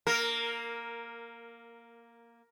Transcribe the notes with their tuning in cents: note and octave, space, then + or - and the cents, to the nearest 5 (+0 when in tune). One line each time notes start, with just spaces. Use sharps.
A#3 +5 A#4 -10